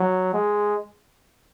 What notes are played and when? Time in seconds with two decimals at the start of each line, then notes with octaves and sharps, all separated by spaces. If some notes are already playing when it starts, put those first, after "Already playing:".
Already playing: F#3
0.34 G#3